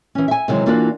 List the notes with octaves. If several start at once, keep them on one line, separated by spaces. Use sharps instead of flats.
E3 C#4
E5 G#5
C3 D#3 E3 F#3 G#3
E3 A#3 D4 F4 F#4